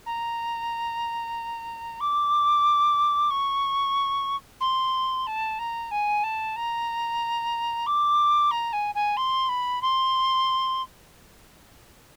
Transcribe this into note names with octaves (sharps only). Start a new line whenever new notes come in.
A#5
D6
C#6
C6
A5
A#5
G#5
A5
A#5
D6
A#5
G#5
G#5
C6
B5
C6